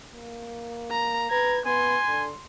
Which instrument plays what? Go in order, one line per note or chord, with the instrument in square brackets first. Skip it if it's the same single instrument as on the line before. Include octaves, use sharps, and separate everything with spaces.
[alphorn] A#3
[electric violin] A#5
[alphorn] B4 [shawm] A#5 [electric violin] G#6
[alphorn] B3 [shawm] G#5 [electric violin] C6
[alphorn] D3